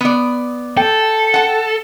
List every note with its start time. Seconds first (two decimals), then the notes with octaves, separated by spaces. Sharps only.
0.01 B3 D5
0.77 A4 G5
1.34 F#5 A5